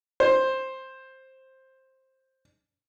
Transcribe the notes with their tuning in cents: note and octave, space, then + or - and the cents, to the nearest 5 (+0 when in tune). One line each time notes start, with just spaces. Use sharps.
C5 +10